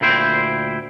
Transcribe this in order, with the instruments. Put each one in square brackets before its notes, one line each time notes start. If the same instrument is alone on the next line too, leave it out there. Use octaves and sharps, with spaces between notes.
[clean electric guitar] D2 A#2 E4 C5 G5